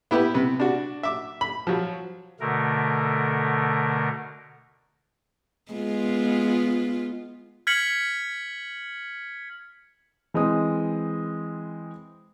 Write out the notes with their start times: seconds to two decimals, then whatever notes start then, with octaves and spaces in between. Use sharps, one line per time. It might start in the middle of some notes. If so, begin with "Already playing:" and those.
0.11 B3 E4 G4 B4
0.34 C3 B4
0.60 D4 F#4
1.03 E5 D6
1.41 B5
1.67 F3 F#3
2.40 B2 D3 A3 A#4
5.72 G#3 B3 F4
7.67 F6 G#6 B6 C#7 F#7
10.34 E3 G#3 C4 D#6